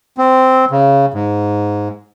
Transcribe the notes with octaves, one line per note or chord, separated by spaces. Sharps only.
C4
C#3
G#2